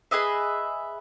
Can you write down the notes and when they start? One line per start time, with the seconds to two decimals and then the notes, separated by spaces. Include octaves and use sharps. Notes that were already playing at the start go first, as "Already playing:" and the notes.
0.11 G#4 B4 D#5 E5